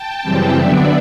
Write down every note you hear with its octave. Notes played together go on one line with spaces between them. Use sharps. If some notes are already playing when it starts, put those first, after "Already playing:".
Already playing: G5 A5
F#2 C#3 E3 G3 C4
D3 F#3 B3 D4 D5 E5